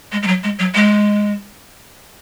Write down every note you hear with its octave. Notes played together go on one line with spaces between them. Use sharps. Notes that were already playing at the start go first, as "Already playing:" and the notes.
G#3
G#3
F#3
G#3
F#3
G#3